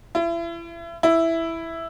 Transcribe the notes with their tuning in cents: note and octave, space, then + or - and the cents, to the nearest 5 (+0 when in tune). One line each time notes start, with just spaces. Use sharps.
E4 +35
E4 +0